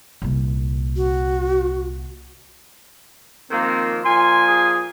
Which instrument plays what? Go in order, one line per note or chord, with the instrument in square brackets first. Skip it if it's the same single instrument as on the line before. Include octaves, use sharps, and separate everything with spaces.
[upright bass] C2 A#2
[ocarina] F#4
[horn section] D#3 F3 A#3 [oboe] C4
[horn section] A#2 F3 G#5 [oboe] C6
[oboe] G#4